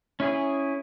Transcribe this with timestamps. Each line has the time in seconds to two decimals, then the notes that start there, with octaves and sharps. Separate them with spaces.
0.20 C#4 E4 G#4